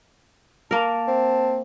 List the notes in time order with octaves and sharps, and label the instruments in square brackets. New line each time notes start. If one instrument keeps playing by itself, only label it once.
[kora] A#3 A#4 [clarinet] A5
[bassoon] C4